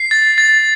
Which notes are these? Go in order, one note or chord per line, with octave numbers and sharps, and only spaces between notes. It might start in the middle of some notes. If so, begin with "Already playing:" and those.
Already playing: C7
A6
A6